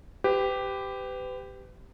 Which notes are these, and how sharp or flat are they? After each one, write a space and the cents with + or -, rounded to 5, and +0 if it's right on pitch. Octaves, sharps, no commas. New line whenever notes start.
G4 +0 B4 +35